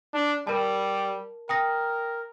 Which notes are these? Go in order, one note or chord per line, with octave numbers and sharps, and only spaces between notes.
D4
G3 A#4 A5
A#4 G5 D#6 A#6